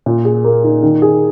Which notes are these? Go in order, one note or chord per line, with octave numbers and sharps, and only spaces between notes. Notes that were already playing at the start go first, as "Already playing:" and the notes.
A#2
G#4
A#3
D#4
D#3
G#4